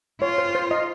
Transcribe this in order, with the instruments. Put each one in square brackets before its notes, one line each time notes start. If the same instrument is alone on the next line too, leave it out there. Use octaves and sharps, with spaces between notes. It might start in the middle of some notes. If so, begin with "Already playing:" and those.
[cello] F4 [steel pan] C#5
[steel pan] C5
C5
D#5